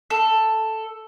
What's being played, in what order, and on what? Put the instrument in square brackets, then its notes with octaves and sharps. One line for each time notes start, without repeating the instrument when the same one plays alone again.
[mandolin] A4